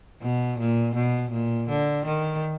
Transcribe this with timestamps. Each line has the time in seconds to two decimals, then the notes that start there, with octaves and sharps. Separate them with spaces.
0.22 B2
0.59 A#2
0.95 B2
1.32 A#2
1.69 D3
2.05 D#3